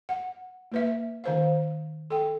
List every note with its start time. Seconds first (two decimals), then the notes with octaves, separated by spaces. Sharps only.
0.09 F#5
0.72 A#3 B4 E5
1.24 D#3 C5 F5
2.10 A4 G5